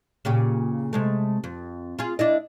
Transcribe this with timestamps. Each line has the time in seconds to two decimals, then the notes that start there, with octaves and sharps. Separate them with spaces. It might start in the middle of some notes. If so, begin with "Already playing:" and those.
0.25 A#2 C#3 G4
0.93 C3 G#3 A3
1.44 F2
1.99 F4 G#4
2.19 D4 E4 D#5